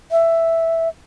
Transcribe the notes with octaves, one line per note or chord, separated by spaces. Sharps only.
E5